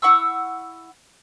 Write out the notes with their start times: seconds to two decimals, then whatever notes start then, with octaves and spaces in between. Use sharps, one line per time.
0.02 E4 F#5 C#6 E6